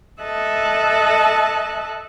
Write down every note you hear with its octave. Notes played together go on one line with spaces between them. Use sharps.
A4 D#5 E5 A5 F#6